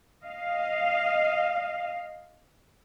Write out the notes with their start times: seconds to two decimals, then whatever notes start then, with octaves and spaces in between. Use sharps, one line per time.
0.25 D#5 F5